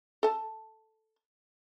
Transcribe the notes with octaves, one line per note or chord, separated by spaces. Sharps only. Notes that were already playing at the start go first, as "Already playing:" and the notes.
A4 A5